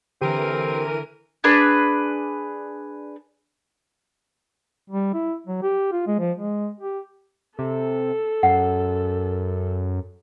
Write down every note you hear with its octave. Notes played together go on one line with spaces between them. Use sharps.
D3 E3 C4 G4 A#4 D#7
D4 G#4 B4
G3
E4
F#3
G4
F4
G#3
F3
G#3
G4
C3 A4
F#2 F#5